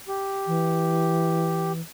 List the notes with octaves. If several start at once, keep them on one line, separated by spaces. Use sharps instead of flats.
G4
E3